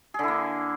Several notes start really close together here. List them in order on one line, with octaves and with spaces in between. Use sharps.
G#4 D3 E4 A#3